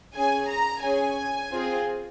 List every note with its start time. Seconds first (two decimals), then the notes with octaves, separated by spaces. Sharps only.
0.15 C#4 G#4 G#5
0.50 A#5
0.83 C#4 G#4 G#5
1.52 C4 F4 G#4